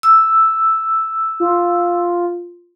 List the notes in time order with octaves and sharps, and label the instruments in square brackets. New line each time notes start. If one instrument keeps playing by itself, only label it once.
[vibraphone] E6
[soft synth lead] F4